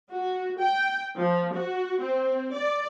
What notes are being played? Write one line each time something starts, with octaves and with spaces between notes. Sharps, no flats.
F#4
G5
F3
F#4
C4
D5